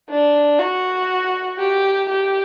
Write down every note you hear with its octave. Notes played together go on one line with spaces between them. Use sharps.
D4
F#4
G4
G4